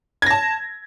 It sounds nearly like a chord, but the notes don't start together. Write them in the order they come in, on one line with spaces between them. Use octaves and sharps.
G#6 A#6 A5